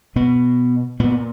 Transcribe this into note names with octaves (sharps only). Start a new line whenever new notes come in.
B2 B3
A#2 B3